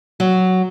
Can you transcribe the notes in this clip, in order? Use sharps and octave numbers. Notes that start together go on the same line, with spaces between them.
F#3